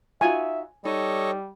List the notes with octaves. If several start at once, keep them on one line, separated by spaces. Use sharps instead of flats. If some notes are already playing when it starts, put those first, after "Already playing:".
D#4 F4 F#4 E5 G#5
G3 D#4 A4 C#5 D#5